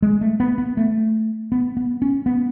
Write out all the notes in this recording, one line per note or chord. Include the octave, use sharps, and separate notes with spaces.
G#3
A3
B3
B3
A3
B3
B3
C#4
B3